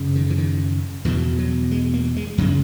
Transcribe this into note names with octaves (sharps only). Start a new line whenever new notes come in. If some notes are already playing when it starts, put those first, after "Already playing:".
Already playing: F#2 C#3
D#3
E3
D#3
E2 B2 E3
F#3
G#3
A#3
G#3
F#2 C#3 F#3